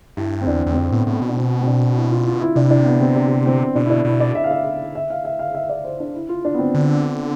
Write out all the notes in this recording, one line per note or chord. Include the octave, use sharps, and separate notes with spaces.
G2 E4
C4
E2 D4
E2 C4
F2 D4
A2 B3
A2 B3
B2
D4
C4
C4
D4
E4
F4
F4
E4
C3 D4
E4
D4
B3
C4
D4
C4
B2 D4
E4
D4
B2 E4
D5
E5
F5
E5
E5
F5
E5
F5
E5
D5
C5
D4
E4
F4
D4
B3
C4
D3